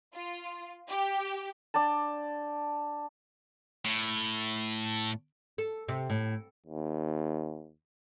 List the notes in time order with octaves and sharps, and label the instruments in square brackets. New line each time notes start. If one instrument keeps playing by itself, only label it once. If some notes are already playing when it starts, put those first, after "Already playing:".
[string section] F4
G4
[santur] D4 D5 G5 A5
[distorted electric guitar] A2
[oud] A4
C3
A2
[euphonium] D#2